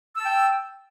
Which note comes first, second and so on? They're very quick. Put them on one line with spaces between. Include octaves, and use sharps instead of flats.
E6 A5 G5